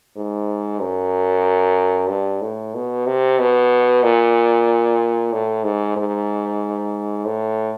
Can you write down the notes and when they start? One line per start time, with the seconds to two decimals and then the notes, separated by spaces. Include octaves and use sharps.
0.16 G#2
0.80 F#2
2.09 G2
2.41 A2
2.75 B2
3.06 C3
3.39 B2
4.03 A#2
5.33 A2
5.64 G#2
5.96 G#2
7.25 A2